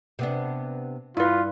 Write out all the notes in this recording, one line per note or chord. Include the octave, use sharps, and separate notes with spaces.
C3 B3 D4
G2 E4 F4 B4